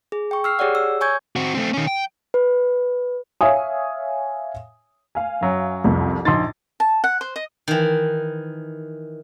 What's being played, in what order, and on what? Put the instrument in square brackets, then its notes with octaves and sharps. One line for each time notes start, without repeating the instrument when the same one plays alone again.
[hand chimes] G#4
G5 C#6
E6 F6 C7
G4 G#4 C#5 D5 F#5
E6
C#5 G#5 C#6 G6 G#6
[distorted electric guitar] C4 F#4
A3 C4
D#3 C#4
G5
[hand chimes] B4
[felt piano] C#5 E5 F5 G#5 D#6
[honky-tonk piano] F5 G#5
[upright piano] F#2 F#3
[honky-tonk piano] C2 F2
[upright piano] A#1 C6 A6 [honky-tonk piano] D#4
[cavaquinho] A5
F#5
C5
D#5
[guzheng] D#3 E3